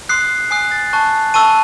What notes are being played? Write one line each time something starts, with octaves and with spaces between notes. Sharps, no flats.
C6 D#6 F#6 C7
G#5 D#6 F#6 C7
A6
A5 C#6 F#6
A5 C#6 E6 D#7